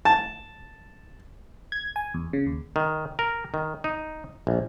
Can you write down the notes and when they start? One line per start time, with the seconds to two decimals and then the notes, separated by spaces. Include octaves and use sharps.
0.05 A5
1.72 G#6
1.96 G#5
2.14 E2
2.33 C#3
2.46 D#2
2.76 D#3
3.19 A#4
3.54 D#3
3.84 D#4
4.47 A#1